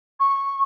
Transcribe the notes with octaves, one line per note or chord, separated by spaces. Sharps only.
C#6